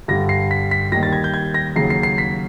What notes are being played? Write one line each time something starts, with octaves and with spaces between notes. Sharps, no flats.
G2 D3 G3 A#6
C7
B6
B6
D#2 D#3 G3 A#6
A6
G#6
G6
G#6
A#6
D#2 C#3 F#3 C7
C7
C7
B6